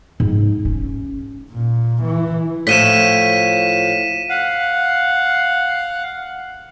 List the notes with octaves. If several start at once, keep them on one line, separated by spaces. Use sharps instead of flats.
G#2
C#4
A#2
E3
A2 F3 C#5 B6 D#7 E7
F5 F#5